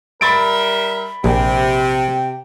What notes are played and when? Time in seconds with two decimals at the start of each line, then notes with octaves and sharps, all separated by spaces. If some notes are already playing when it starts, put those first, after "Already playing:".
0.21 G3 A#4 E5 B5 A6 D7
1.24 A#1 C3 G5